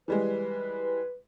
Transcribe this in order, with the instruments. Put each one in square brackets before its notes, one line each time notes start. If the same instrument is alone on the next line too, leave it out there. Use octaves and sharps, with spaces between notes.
[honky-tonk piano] E3 G3 G#3 [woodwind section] B4